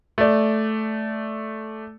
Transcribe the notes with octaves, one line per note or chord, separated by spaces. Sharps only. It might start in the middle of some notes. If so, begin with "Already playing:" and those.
A3 D5